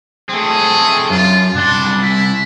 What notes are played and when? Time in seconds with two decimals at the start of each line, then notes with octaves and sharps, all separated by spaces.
0.29 A3 C4 G#4
1.10 F#2 F4
1.55 C2 D4 C6
2.02 E4